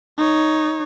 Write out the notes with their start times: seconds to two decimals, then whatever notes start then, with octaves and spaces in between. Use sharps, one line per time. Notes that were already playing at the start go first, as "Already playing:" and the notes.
0.18 D#4 C#5